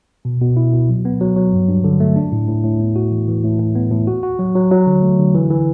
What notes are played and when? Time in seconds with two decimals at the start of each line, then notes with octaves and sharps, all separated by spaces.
0.25 B2
0.41 B2
0.57 E4
0.73 B2
0.89 F#3
1.05 B3
1.20 F#3
1.36 F#3
1.53 G2
1.68 G2
1.84 D3
2.00 A3
2.16 D4
2.32 A2
2.48 A2
2.64 A2
2.80 B3
2.96 F#4
3.11 E3
3.28 E3
3.44 A2
3.60 A2
3.75 B3
3.91 A2
4.07 F#4
4.23 F#4
4.39 F#3
4.55 F#3
4.71 F#3
4.87 D3
5.03 A3
5.19 D3
5.35 E3
5.50 E3